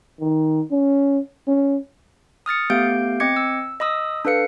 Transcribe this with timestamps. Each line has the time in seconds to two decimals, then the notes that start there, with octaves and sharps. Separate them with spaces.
0.21 D#3
0.71 C#4
1.48 C#4
2.46 D#6 F6 A6 C#7
2.70 A3 B3 G4 F5 G6 D7
3.20 C4 D#5 D6 G#6 C#7
3.36 E6
3.80 D#5 B5 D#6 E6
4.25 D4 A4 B4 F5 C#7